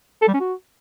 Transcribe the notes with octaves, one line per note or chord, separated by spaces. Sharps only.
A4
G3
C#4
F#4